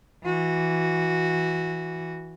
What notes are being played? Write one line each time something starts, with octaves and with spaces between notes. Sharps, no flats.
E3 F#4